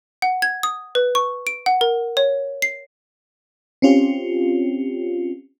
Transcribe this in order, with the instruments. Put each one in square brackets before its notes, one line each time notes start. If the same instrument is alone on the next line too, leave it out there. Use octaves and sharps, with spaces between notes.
[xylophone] F#5
G#6
D#6
B4
C#6
D7
F#5
A#4
C#5
C7
[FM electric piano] C4 C#4 F4 G4